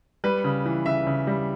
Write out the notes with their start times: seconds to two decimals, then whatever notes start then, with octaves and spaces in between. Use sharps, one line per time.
0.24 G3 B4
0.44 C#3
0.65 E3
0.86 C#3 E5
1.07 C#3
1.27 G3